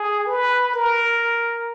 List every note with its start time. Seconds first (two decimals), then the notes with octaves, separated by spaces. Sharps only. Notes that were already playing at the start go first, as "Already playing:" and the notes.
Already playing: G#4
0.27 B4
0.74 A#4